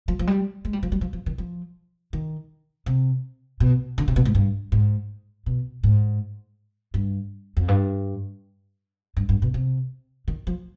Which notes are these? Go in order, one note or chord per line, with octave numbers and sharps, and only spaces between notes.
F3
F3
G3
G#3
G3
F3
G3
F3
F3
D#3
F3
D#3
C3
B2
D3
C3
B2
G#2
G2
G#2
B2
G#2
G2
F2
G2
G2
G2
B2
C3
D#3
F3